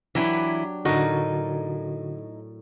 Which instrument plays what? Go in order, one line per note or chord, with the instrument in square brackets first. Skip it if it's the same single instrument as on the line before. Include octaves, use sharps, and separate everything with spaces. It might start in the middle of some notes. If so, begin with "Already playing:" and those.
[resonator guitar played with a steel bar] E3 E4 [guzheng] F#3 D4 G4
[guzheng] A2 A#4 [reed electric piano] D3 F#4 [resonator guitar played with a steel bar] D#4